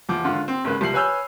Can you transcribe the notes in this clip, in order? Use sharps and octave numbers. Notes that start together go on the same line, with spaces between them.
E2 F3 D6
G#1 D3 F4 F#5
C4
G#1 C#3 A#3 B4
C2 F3 C7 F#7
B4 C#5 G#5 E6 F6 G6